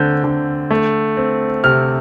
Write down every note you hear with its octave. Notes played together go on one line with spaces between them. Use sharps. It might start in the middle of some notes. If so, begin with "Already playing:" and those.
Already playing: D3 A3 C4 G6
D3
A3
C4
C3 F6